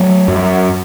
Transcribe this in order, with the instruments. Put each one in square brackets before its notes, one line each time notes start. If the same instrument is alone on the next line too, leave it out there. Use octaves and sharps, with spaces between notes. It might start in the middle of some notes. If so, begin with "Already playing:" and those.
Already playing: [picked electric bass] F#3 A3
F#2